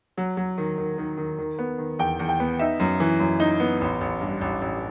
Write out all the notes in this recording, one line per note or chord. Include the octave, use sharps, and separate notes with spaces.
F#3
F#3
D#3
D#3
D#3
D#3
D#3
B3
D#3
E2 G5
E2
G5
B3
D#4 E5
F#2
E3
F#2
D#4
B3
A1
A1
G2
A1
A1